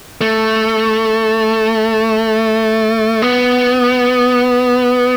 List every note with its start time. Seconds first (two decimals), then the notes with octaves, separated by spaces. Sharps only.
0.21 A3
3.22 B3